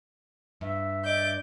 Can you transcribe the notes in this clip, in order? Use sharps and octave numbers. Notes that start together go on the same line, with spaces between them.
G2 E5
D5 D#5 D6 G6